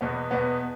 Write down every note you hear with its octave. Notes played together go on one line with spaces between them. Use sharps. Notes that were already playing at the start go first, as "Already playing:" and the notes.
E2 B2 B3
E2 B2 B3